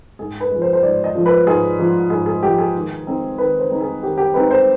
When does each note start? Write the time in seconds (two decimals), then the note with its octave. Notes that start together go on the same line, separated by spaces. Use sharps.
0.19 G#2 G#4
0.41 B4
0.51 F3 G#3
0.62 C5
0.73 C5
0.83 G#2 D5
1.04 D#5
1.15 F3 G#3
1.26 B4
1.47 G#2 G#4
1.79 F3 G#3
2.10 G#2 G#4
2.26 G#4
2.42 F3 G#3 G4
2.58 G#4
2.75 D#3
3.07 G#3 C4 D#4
3.38 D#3 B4
3.59 C5
3.70 G#3 C4 D#4
3.81 G#4
4.03 D#3 G4
4.18 G4
4.34 G#3 C4 D#4 B4
4.51 C5